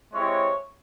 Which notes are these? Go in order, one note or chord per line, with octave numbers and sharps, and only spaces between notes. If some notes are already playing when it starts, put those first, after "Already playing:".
G#3 C4 E4 G4 C#5